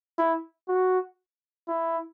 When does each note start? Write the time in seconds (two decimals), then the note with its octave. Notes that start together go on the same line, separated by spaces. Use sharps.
0.18 E4
0.68 F#4
1.68 E4